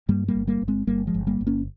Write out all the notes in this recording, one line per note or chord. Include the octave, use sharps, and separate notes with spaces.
G2 G3 A#3
G3 A#3
G1
G3 A#3
G1
G#3 C4
G1 G3 A#3
F3 G#3
G1
G3 A#3
G1
A#3 C#4